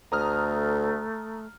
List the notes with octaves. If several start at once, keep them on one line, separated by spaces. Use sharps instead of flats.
D2 A3 A#5 D#6 F6